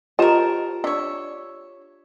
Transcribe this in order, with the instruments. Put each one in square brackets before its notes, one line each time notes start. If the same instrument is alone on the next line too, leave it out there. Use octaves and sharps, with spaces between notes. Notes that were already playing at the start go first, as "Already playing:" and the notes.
[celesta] F4 G4 E7 [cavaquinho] A#4 A5 [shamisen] C5 D#5
[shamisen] D4 [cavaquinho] C#5 E5